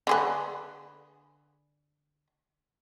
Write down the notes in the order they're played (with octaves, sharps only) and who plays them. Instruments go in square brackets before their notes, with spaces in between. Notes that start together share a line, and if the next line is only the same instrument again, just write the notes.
[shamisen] D3 G#4 B4